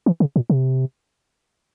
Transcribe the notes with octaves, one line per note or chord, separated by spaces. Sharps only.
E3
C#3
A#2
C3